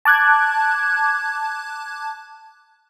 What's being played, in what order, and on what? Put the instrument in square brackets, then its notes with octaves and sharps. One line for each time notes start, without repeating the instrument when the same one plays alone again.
[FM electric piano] A5 D6 F#6 G#6